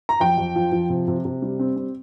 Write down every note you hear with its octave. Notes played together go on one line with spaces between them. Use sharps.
A#5
F2 G5
F2
F3
F3
C3
C3
C3
G3
C4
C4